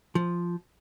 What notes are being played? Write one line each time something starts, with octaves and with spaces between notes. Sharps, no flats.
F3